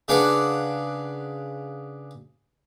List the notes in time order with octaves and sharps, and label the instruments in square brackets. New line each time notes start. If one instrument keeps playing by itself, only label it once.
[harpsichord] C#3 D4 B4 F#5 D6